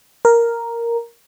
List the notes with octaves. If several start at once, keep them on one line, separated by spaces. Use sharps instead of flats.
A#4